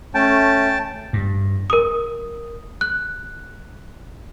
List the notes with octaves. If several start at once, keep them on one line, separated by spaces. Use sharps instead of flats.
A3 C#4 G5 A5
G2
A#4 D#6
F#6